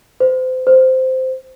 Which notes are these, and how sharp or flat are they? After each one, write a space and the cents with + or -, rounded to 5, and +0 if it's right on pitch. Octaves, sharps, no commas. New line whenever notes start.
C5 -30
C5 -10